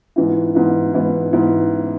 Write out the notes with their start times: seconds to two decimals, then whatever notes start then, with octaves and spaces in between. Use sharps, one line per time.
0.16 G#2 E3 B3 E4
0.55 G#2 E3 B3 E4
0.94 G#2 E3 B3 E4
1.33 G#2 E3 B3 E4